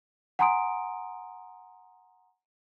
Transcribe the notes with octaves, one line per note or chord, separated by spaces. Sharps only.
F#5 G#5 A#5 C6 D#6 D7